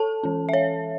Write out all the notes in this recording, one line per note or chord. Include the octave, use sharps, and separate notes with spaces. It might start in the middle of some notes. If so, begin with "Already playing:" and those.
Already playing: A4 A5
E3 C#4
E5
C#5